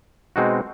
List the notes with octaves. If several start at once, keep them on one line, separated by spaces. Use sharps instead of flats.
B2 G#3 C4 D#4 F#4